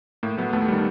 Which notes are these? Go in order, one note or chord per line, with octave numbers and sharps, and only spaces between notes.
A2 A#3
F#3 A3 B3
D#2 A3 B3
D#3 G3